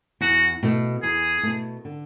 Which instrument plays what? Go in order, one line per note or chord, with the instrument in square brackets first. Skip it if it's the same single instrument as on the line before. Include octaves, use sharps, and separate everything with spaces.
[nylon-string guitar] E2 [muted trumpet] F#4
[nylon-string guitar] B2 A3
[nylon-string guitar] E2 [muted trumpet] G#4
[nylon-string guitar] B2 A3
D3